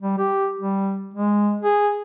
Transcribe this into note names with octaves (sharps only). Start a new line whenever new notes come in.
G3
G4
G3
G#3
G#4